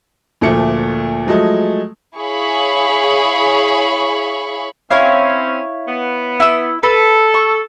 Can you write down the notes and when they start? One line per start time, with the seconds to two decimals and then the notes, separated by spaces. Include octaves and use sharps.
0.41 D2 A#2 F3 A3 C#7
1.27 F3 F#3 G#3 A3
2.18 E4 G#4 C#5 F5 B5 C#6
4.91 C4 C#4 E4 C#5 F5
5.87 B3
6.40 E4 E6
6.83 A4 B4
7.34 C#6